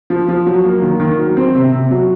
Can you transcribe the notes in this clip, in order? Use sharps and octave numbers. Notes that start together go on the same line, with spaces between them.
F3
F3
F#3
A#3
D#3
D#3
F#3
C4
C3
C3
F#3